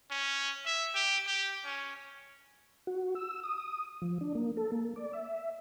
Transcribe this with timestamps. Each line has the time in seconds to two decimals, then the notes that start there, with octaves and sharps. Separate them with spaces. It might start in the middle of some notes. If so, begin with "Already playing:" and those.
0.11 C#4
0.66 E5
0.95 G4
1.27 G4
1.65 C#4
2.87 F#4
3.15 E6
3.43 D#6
4.02 F3
4.21 D4
4.35 A#3
4.57 A4
4.72 A#3
4.96 D5
5.13 E5